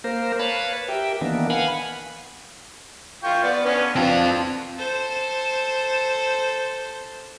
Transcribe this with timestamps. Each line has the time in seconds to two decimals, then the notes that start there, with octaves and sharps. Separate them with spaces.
0.04 A#3 A#4 C5
0.39 B4 C#5 F5 A5 B5
0.88 G4 A#4 E5 G5
1.21 D#3 E3 A#3 B3 D4
1.50 F5 F#5 G#5 B5
3.24 F4 G5 C#6
3.43 B3 D5
3.65 B3 C#4 D4
3.96 C4 D4 F4
4.77 A4 C5